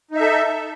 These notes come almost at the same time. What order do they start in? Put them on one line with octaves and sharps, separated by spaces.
D#4 E5 A4